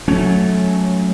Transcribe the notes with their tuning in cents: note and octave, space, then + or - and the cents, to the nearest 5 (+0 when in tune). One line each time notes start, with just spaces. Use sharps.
F#3 -15 A3 -20 C#4 +0